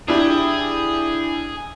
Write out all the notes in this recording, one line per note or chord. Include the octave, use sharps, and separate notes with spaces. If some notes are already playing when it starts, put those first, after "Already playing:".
D4 E4 G4 G#4